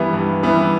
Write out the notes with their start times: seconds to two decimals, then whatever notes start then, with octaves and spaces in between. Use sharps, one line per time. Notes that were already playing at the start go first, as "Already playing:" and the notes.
Already playing: G2 E3 G3 B3 E4
0.13 G2
0.43 E3 G3 B3 E4